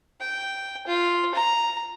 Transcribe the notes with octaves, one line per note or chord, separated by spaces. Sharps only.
G5
F4
A#5